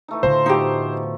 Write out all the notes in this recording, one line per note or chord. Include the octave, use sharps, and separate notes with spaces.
E3 A3 D#4
A2 D3 F3 C5 A#5 C6
B2 F3 A3 D#4 G4